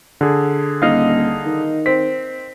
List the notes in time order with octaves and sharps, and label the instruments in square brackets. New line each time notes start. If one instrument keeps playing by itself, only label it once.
[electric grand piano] D3 G#4
[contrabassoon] D#1 [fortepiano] D#4 F5
[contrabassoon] D#3
[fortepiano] C4 [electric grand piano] B6